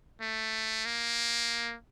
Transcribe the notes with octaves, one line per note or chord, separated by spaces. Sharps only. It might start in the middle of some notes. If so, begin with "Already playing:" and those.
A3
A#3